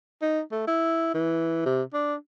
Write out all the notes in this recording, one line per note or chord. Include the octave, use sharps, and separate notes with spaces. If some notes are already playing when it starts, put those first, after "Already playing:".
D#4
A3
E4
E3
C3
D4